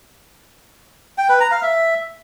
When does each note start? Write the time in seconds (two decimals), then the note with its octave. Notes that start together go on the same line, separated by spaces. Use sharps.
1.18 G5
1.29 B4
1.40 A#5
1.51 F5
1.63 E5